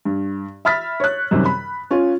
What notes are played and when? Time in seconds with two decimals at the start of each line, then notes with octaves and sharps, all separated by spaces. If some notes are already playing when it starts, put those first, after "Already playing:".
0.05 G2
0.65 E5 B5 F6 A6 B6
1.00 C#5 F#6
1.31 F#2 C3 D#3 G3
1.45 B5
1.91 C#4 F4